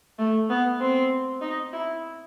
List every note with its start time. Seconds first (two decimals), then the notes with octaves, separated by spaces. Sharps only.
0.19 A3
0.50 B3
0.81 C4
1.41 D#4
1.73 E4